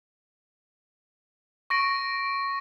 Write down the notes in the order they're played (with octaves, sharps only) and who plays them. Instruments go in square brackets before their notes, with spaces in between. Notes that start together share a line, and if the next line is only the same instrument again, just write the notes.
[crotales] C#6 A#6 D7